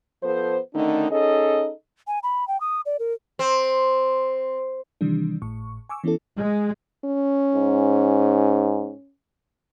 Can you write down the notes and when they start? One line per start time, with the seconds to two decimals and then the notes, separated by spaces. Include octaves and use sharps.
0.23 F3 B3 A4 C5
0.74 D3 D#3 A3 C#4 D#4
1.10 C#4 D#4 G#4 A4 D#5
2.07 G#5
2.23 B5
2.48 G5
2.60 D#6
2.86 D5
2.99 A#4
3.39 C4
5.01 C3 D#3 E3 G3 D4
5.42 G#1 A2 C#6
5.89 G#5 C#6 D6 E6
6.04 E3 B3 C#4 E4 A4
6.38 G#3
7.05 C#4
7.55 G#2